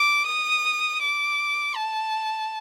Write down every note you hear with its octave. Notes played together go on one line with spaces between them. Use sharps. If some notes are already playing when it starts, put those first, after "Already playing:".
Already playing: D6
D#6
D6
A5